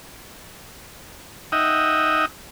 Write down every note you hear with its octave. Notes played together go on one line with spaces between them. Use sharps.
D#4 D#5 E5 F#5 G5